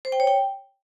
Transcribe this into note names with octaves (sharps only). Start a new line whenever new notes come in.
C5
G5
C#5
G5